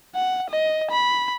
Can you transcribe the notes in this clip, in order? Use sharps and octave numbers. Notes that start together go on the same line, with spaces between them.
F#5
D#5
B5